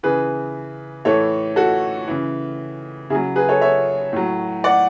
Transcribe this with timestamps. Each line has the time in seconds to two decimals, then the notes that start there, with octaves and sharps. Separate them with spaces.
0.03 C#3 E3 G#4 B4
1.05 A2 E3 A4 C#5
1.56 F#4 A4
2.08 C#3 E3
3.10 C#3 E4 G#4
3.15 F#3
3.36 G#4 B4
3.49 A4 C#5
3.61 C#5 E5
4.13 A2 F#3
4.64 D5 F#5